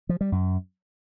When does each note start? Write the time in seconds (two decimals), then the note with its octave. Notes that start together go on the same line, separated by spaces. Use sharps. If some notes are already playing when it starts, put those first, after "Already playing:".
0.09 F3
0.21 G3
0.32 F#2